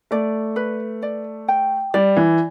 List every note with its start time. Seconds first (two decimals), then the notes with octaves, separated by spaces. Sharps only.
0.11 A3 D5
0.56 B4
1.03 D5
1.48 G5
1.94 G3 D5
2.17 E3